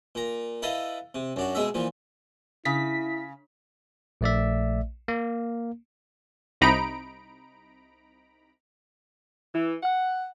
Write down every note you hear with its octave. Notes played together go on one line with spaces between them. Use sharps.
A#2 A#5
E4 A4 B4 D#5 F5
C3
F#2 D4 F#4
B2 G#3 G#4 E5
A#2 E3 F3
C#3 E4 B6
A#1 A3 D5 E5
A#3
C2 C3 D#4 A#5 B5 D7
E3
F#5